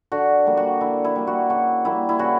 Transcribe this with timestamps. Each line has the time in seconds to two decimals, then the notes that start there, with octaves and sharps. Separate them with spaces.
0.12 D3 F#4
0.46 G3 A#3
0.57 F#4
0.81 D3 E4
1.05 E4
1.16 G3 A#3
1.27 F#4
1.50 C#3 F#4
1.85 G3 A#3 E4
2.09 E4
2.19 C#3 F#4